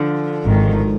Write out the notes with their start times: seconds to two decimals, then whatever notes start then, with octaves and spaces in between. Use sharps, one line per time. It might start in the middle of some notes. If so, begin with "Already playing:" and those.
Already playing: D3 F3
0.46 G#1 G#2 D#3